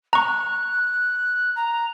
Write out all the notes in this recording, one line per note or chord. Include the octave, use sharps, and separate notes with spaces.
A#5 C#6 F#6
A#5